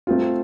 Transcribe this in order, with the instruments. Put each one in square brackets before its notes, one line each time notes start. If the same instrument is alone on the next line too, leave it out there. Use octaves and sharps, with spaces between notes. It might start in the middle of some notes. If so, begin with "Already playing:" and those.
[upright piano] A3 C4 F4